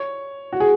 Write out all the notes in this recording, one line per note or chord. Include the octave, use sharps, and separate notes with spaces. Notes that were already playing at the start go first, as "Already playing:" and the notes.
Already playing: C#5
F#4
G#4